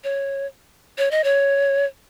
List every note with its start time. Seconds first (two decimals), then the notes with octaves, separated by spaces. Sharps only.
0.04 C#5
0.98 C#5
1.11 D#5
1.24 C#5